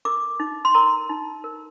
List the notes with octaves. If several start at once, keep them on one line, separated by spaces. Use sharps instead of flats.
A#4 D6
D#4
C6
A#4 A#5
D#4
A#4